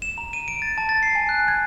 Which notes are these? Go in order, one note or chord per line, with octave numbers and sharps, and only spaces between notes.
E7
A#5
D#7
D7
A6
A5
A6
C7
G#5
F#6
G#6